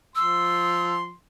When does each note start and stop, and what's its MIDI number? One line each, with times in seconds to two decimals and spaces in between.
0.16 1.13 53
0.16 1.13 84
0.16 0.95 88